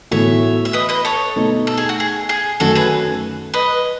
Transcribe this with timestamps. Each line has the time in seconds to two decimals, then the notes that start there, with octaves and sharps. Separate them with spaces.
0.11 A2 E3 B3 F#4 A4 C#5 E5
0.65 E5
0.73 B4 D#5
0.89 B4 D#5
1.05 A4 C#5
1.36 B2 A3 D#4
1.67 A4
1.77 G#4
1.89 F#4
2.00 G#4
2.29 G#4
2.60 F#2 D#3 F#3 A3 F#4 A4
2.75 G#4 B4
3.54 B4 D#5